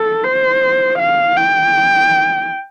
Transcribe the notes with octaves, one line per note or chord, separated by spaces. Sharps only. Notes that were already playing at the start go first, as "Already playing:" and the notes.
Already playing: A4
C5
F5
G5